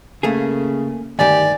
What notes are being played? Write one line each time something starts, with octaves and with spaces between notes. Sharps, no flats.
C#3 A3 A#3 G#4
D2 G2 D#3 G4 D5 G#5